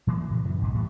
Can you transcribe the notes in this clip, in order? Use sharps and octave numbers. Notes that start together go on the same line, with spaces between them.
A#2 E3 F#3 A#3
A#2 C#3 E3 F#3
F#2 C#3 E3
B1 G#2
A2 E3 G3